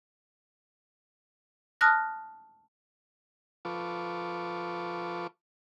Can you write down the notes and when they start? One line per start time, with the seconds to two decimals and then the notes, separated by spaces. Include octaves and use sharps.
1.81 A5 D#6 F6 F#6 A#6
3.65 F3 F4 A4 B4 C#6 D6